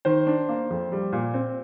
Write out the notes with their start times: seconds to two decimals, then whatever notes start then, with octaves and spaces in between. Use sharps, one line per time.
0.05 D#3 C5
0.27 D4
0.49 A#3
0.70 F2
0.92 G3
1.12 A#2
1.34 C4